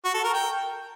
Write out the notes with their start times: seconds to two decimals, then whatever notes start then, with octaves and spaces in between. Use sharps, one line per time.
0.05 F#4
0.14 A4
0.24 A#4
0.34 G5